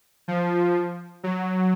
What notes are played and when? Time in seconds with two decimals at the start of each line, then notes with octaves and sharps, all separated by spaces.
0.28 F3
1.24 F#3